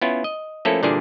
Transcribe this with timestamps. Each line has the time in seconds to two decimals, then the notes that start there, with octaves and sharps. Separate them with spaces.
0.02 B3 C#4 E4 F4
0.24 D#5
0.65 F3 A3 A#3 C#4 E4 A4
0.83 A#2 D3 E3 G3 D4 G#4